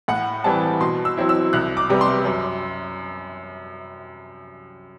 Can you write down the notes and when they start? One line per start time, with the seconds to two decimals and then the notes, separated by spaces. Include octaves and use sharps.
0.08 A2 F#5
0.44 E3 G3 C4 A5
0.80 B2 C6
1.05 E6
1.17 F#3 C4 E4
1.29 E6
1.53 C2 F#6
1.77 D6
1.89 C3 G3 B3
2.01 C6
2.25 F#2